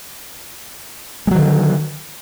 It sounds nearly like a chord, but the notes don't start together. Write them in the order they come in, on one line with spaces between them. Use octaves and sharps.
G#3 F#3 D#3 D3